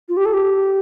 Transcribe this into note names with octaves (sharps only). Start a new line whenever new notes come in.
F4
G4
A4
G4